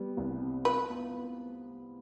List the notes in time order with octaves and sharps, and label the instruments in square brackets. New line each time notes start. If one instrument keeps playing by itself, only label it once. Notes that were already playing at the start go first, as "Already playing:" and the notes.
Already playing: [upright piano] G3 B3
C2
C3
[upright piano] F4 [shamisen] B4
[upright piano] B3